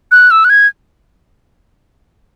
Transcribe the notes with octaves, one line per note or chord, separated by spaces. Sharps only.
F#6
E6
F#6
G#6